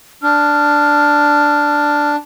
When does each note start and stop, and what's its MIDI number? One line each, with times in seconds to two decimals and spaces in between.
0.23 2.16 62
0.23 2.10 89